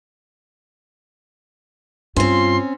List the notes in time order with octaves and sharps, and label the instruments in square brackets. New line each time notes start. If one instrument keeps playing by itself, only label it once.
[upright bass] G2 [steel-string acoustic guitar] C4 C#4 [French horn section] F4 [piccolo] C6